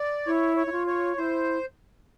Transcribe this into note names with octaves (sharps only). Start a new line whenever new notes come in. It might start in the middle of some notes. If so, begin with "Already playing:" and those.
Already playing: D5
E4 C#5
C#5
E4
F4
C#5
E4 C5